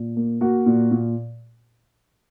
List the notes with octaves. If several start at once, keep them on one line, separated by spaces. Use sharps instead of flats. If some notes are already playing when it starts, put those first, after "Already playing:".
Already playing: A#2
A#3
A#3 F#4
A#2
A#2